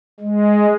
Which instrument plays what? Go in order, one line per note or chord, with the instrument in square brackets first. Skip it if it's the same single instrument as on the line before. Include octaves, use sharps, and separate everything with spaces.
[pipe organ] G#3